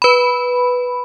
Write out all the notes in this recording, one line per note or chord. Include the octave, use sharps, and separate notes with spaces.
B4 B5